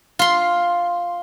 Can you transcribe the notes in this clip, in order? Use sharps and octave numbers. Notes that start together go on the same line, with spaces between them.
F4 C6